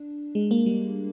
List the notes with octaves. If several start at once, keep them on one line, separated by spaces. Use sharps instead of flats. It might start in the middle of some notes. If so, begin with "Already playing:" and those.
Already playing: D4
G#3
A#3
G3